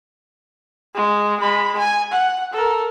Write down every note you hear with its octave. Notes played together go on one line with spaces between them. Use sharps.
G#3
G#3 B5
G#5
F#5
A4 A#4